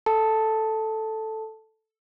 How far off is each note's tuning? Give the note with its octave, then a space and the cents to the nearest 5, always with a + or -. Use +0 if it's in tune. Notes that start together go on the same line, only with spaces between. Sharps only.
A4 +0 A5 +0